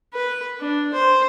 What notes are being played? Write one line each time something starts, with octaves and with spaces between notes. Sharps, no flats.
B4
D4
C5